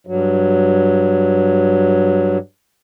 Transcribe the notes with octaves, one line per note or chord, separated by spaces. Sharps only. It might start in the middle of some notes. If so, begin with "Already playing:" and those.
G2 F#3